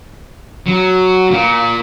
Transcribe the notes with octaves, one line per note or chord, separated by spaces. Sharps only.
F#3
A#2